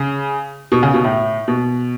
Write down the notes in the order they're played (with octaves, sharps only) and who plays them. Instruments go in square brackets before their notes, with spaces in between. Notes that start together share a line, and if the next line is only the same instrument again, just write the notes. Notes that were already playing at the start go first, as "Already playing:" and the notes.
Already playing: [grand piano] C#3
B2
C#3
B2
A2
B2